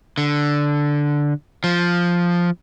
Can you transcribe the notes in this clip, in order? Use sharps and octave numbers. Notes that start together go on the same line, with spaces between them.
D3
F3